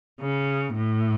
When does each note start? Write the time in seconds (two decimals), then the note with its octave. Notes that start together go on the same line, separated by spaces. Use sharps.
0.21 C#3
0.75 A2